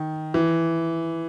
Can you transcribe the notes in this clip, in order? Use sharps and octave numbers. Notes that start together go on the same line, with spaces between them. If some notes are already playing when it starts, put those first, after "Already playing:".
Already playing: D#3
E3